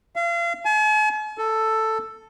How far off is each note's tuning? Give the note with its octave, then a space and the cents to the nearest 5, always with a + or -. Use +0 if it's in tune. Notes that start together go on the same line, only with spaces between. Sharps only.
F5 -35
G#5 +45
A4 +5